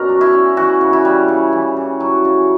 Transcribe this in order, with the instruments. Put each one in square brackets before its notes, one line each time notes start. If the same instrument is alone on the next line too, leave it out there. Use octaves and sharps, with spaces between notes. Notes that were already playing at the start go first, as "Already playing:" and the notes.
Already playing: [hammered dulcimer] B2 C#4 A#4 D5
F#3
E4
C#4
E3 F#4
C#3
E4
G3
C#3
E3
C#3
F#3
C#3